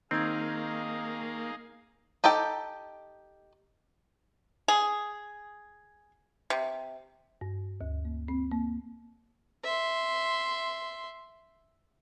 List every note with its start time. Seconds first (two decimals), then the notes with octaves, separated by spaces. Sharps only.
0.11 D#3 A#3 C4 D#4 G#4 D#5 F5 G#6
2.24 D#4 G4 A4 G5
4.68 G#4
6.50 C3
7.41 G2
7.81 D2
8.05 A#3
8.28 C4
8.51 A#3
9.63 E5 C6